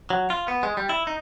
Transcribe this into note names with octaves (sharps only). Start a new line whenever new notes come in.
F#3
F4
B3
G#3
G3
E4
D#4